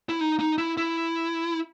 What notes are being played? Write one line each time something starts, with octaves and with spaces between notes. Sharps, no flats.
E4
D#4
D#4
E4
E4